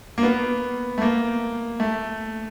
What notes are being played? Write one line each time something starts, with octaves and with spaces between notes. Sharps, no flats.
A#3
B3
A3
A#3
A3